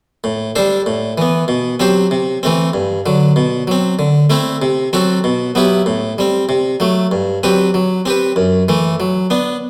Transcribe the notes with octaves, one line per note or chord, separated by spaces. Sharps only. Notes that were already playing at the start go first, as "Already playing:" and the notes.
A2
G3 D4 A4 C5
A2
E3 B3
B2
F#3 C4 G4 C5
C3
E3 A3 C4
G2
D3 F#3
B2
F#3 C4
D3
A3 C4 E4
C3
F#3 C4 F#4 A4
B2
F#3 B3 E4 G4
A2
G3 C4
C3
F#3 A3
G2
F#3 C4 G4 B4
F#3
C4 G4 B4
F#2
E3 A3
F#3
B3 D4